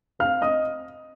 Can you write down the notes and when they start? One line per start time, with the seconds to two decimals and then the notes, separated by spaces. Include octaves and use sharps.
0.19 C4 F5 F6
0.42 C4 D#5 D#6